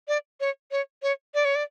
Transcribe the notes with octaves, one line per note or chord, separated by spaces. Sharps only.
D5
C#5
C#5
C#5
D5
C#5
D5